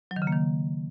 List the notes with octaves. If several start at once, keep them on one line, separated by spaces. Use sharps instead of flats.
F#3
D#3
C#3
A#3
D#3